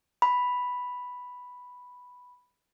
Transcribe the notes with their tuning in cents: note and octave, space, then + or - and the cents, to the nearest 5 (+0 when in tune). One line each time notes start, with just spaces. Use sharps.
B5 +0